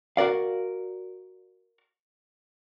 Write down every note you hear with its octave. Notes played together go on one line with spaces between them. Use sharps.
F#4 A#4 D5 F5